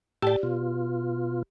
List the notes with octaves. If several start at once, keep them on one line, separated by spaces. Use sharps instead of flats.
A2 G4 D5 G5 A5
B2 F4